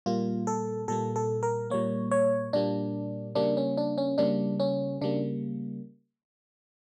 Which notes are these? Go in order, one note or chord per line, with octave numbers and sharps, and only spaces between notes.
A#2 G3 A#3 F4
A4
A#2 G3 A#3 A4
A4
A#4
A#2 G3 A#3 C#5
C#5
A#2 G3 A#3 D4
C#3 G3 A#3 D4
C#4
D4
C#4
C#3 G3 A#3 D4
C#4
C#3 G3 A#3 D4